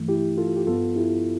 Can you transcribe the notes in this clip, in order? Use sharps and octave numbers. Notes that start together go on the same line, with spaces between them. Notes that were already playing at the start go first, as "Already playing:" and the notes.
Already playing: G2 E3 A3
E4 G4
F4 A4
G4
G2 F3 B3 F4 A4
E4 G4